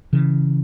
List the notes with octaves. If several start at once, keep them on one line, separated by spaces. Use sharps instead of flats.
C#3 E3